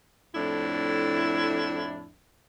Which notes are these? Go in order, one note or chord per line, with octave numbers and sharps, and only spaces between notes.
F2 A2 D4 E4